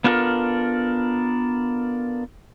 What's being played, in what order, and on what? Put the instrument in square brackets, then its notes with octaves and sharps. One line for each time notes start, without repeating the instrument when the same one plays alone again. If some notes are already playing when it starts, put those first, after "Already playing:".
[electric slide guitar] B3 D4 F4 F#4 A4 A#4